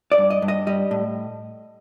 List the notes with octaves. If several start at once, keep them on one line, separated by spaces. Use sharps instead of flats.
D5
G2
D#5
G2
D#5
G3 D#5
A2